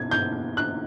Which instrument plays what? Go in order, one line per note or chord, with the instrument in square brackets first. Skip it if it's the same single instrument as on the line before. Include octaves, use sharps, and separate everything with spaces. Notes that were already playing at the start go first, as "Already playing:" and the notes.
Already playing: [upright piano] B2 G#6
G6
F#6